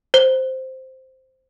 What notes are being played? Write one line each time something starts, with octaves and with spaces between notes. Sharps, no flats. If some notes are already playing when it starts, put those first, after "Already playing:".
C5 G7